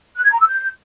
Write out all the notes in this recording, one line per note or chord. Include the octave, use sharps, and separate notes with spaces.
F#6
G#6
A#5
E6
G6